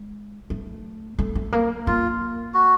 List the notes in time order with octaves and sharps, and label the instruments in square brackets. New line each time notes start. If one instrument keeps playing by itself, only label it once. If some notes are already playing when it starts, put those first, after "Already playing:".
Already playing: [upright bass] G#3
A3
A3
A3
A#3
[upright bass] A#3 [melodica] F4
[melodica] F#4